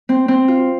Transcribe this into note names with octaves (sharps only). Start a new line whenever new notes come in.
C4
C4
F4